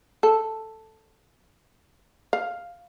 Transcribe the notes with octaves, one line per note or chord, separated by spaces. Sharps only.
A4
F5